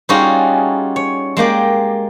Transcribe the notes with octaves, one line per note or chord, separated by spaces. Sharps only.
G3 C#4 D#4 F4 F#4 G#4
C#5
G#3 A#3 G4 D5